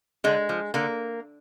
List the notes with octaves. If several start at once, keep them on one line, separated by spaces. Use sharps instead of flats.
D3 G#3
F3
D3 A#3